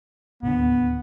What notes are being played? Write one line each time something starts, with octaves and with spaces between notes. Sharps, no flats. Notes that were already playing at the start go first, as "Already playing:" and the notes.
D1 D#2 D3 B3